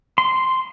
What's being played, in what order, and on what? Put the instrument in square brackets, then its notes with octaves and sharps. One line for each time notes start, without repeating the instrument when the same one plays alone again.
[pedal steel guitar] C6